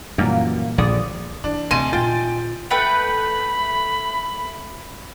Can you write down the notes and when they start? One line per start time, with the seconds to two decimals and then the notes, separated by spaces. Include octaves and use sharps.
0.18 F#2 A#2 E3 G3 A#3
0.78 A#1 D3 D5 D#6
1.44 E3 D4
1.71 D2 C3 D#5 G#5 A5 C6 D#7
1.93 D#2 A#2 F4 G5 A6
2.71 A3 B4 G5 B5